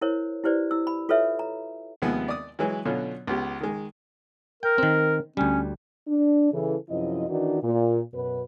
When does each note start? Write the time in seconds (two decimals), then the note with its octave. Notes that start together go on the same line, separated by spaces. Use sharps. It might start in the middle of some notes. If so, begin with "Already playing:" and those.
0.01 E4 A#4 C5 C#5
0.44 E4 G4 B4 C5 D5
0.71 E4 E6
0.87 B5
1.09 F4 A4 B4 C#5 E5
1.39 A#5
2.02 D#2 C3 F3 G#3 B3
2.28 D5 D#6
2.59 E3 F#3 G#3 B4
2.85 B2 D3 F#3 C#4 F4
3.27 C#2 B3 G4
3.61 D#3 G#3
4.63 A#4 G5
4.78 D#3 C4
5.37 D2 G3 C#4
6.07 D4
6.52 C#3 E3 A4
6.89 F#2 C3 F3 E4 D#5
7.28 D#3 E3 D4 D#4 F#4
7.62 A#2
8.13 F#2 B2 B4